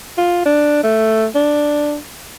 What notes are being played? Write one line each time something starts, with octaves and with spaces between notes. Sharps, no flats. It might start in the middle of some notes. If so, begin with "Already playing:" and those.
F4
D4
A3
D4